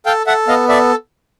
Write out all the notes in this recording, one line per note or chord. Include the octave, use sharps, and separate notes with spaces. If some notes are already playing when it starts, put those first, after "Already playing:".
A4 F5 G5
A4 E5 F#5
B3 D#5 F5
A4 D5 E5